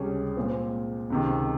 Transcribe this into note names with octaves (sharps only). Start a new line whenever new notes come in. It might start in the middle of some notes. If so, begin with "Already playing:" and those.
Already playing: C#2 C3 G3 C#4 G#4
A#2 G#3 C4
C#2 C3 D#3